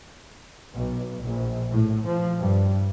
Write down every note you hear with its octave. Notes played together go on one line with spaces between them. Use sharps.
B1
A#1
A2
F3
G2